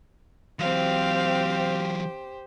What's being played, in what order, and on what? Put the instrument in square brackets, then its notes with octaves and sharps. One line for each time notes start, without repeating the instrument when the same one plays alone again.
[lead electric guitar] E3 F#3 [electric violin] C4 F5 [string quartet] G4 C5